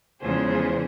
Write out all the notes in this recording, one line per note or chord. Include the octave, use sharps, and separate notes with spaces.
E2 C#3 F3 G#3 G#4 C5